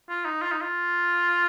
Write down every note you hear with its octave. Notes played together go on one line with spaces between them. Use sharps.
F4
D#4
F4
D#4
F4